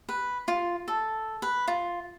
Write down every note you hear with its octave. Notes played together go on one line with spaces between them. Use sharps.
B4
F4
A4
B4
F4